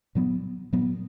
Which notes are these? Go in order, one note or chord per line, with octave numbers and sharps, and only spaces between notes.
A#2 F#3 B3
A#2 F#3 B3